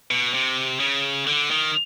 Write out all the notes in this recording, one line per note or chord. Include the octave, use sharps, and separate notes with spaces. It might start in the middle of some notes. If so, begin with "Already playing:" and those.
B2
C3
C#3
D3
D#3